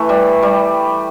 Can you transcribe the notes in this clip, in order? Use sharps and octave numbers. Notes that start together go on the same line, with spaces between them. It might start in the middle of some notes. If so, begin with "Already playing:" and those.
Already playing: E3 A3
G3
G3